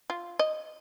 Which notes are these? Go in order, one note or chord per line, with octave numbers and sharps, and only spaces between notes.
F4
D#5